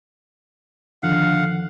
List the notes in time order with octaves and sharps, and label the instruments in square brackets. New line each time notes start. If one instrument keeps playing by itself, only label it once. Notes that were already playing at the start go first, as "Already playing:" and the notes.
[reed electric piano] F2 D#3 F3 [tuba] D3 [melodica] F5 F#5